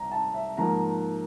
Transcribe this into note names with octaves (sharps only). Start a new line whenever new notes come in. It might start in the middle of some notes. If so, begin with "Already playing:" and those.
Already playing: C2 A#5
A5
E5
G#2 F3 A#3 A#5